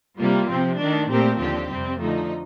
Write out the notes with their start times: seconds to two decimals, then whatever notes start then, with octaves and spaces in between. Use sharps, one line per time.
0.19 C3 G3 A#3 F4
0.48 C3 F3 C4
0.78 D#3 A3 D4
1.09 A#2 A3 C4 G4 A#4
1.39 D#2 D3 F3 C4 G4
1.69 F2 C3 G3 C4
1.99 D3 F3 A3 D#4